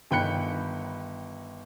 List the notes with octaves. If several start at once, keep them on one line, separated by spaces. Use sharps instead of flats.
G1 D#3 G5 B5 F#6 C#7